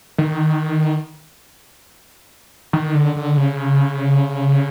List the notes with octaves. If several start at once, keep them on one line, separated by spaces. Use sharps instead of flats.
D#3
D#3
D3
D3
C#3